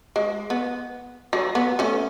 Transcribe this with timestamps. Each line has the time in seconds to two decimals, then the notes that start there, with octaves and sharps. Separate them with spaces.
0.16 G#3
0.50 B3
1.33 F#3
1.55 B3
1.79 A3 C#4